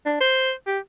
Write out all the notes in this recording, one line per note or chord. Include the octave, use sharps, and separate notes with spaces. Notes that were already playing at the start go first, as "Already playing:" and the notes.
D4
C5
G4